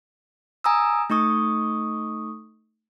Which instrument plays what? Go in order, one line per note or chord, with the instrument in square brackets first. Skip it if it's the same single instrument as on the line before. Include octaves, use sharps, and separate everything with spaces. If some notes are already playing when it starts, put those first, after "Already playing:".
[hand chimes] G#5 A#5 D#6 E6
A3 D#4 C#6 D#6